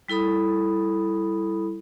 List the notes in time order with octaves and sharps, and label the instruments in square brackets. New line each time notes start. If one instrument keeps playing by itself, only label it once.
[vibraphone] G3 E4 A4 B5 D#6